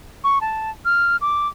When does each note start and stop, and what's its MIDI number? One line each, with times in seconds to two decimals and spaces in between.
0.24 0.39 85
0.41 0.70 81
0.85 1.17 89
1.21 1.48 86